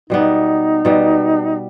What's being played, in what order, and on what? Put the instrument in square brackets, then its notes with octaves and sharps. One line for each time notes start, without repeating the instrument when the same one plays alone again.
[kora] B2 G3 B3 [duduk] D#4
[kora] B2 G3 B3